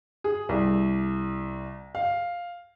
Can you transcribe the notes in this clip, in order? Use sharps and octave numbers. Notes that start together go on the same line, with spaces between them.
G#4
C2
F5